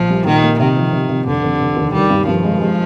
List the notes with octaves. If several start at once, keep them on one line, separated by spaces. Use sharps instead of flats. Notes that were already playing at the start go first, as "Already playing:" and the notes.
Already playing: A#1 F3
G3
A#2 D#3
A#3
C3 D#3
F3
C3
C3
F1 D3
F1
F1
D#2
D#3 G3
G2
G2 F3
G#3
G#3